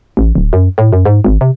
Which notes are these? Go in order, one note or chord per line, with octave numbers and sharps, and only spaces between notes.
A1
D1
F#2
A2
F#2
G#2
G#1
C3